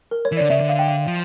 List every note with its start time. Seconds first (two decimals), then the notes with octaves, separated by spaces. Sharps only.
0.11 A#4
0.25 C#5
0.32 E3
0.37 D3 D5
0.50 C#3 E5
0.60 D3
0.69 F5
0.79 G5
0.88 F5
1.07 F3